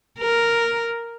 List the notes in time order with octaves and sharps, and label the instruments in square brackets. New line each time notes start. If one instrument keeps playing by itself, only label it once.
[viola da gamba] A#4